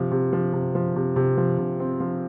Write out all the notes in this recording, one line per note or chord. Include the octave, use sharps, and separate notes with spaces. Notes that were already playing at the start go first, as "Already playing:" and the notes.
Already playing: C3 F3
C3
F3
C3
F3
C3
C3
F3
C3
C4
F3